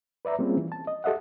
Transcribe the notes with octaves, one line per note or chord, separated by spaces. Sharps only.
B4 D5 E5 A#5
G3 A#3 C4 C#4 F4 G#4
E3
A5
D#5
G4 A4 D#5 E5 F#5